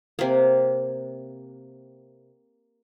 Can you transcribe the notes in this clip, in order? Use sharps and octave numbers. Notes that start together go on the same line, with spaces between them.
C3 A#3